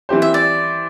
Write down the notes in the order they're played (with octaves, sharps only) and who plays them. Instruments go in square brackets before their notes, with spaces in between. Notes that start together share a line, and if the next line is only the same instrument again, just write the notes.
[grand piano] E3 C4 E4 G4 C5
[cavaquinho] E5
D5